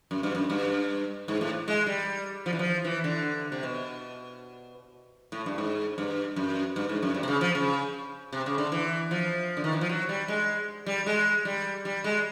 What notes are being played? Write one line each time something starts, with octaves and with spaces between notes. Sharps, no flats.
F#2
G2
F#2
G2
G#2
A2
G#3
G3
F3
E3
F3
E3
D3
C3
B2
A2
G2
G#2
G2
F#2
G2
G#2
F#2
G2
C3
C#3
F3
C#3
C3
C#3
D3
E3
F3
D3
D#3
E3
F3
F#3
G3
G#3
G3
G#3
G3
G3
G#3